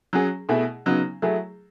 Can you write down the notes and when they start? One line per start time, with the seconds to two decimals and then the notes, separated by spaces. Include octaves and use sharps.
0.13 F#3 C#4 G#4
0.49 B2 A3 E4 G#4
0.86 C#3 F#3 B3 D#4
1.22 F#3 A3 E4 G#4